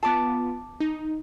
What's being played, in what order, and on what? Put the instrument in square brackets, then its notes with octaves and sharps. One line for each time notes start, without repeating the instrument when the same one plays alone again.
[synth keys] B3 F4 [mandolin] A5 D6
[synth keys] D#4